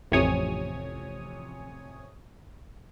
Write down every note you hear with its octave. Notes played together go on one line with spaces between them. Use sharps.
A1 F2 C3 C#5 G#5 D#6